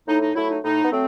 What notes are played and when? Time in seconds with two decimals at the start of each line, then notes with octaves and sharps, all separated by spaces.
0.07 A2 D#4
0.21 D#4
0.34 F#3 A3 E4
0.49 D#4
0.63 A2 D#4
0.84 B3
0.91 F#3 A3 C4